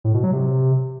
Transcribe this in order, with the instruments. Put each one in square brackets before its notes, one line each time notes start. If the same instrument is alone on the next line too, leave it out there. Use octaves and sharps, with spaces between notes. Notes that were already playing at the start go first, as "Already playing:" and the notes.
[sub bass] A2
B2
F#3
C3